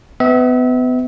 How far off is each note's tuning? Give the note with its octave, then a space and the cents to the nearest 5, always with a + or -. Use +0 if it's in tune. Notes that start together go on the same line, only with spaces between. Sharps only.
B3 +30 E5 -30